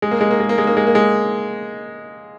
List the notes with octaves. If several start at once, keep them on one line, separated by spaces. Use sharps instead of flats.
G#3
A#3
G#3
A#3
G#3
A#3
G#3
A#3
G#3
A#3
G#3